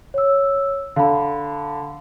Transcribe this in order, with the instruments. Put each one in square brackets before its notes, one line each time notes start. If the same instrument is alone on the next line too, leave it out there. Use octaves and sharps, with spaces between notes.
[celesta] C#5 E6
[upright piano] D3 [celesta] F5 B5